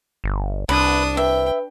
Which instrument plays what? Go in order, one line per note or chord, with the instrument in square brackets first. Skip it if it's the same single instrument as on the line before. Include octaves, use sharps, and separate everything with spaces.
[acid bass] G1
[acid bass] C2 [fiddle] D4 D#6 [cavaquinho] B4
[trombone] B4 [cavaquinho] E5 [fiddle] G5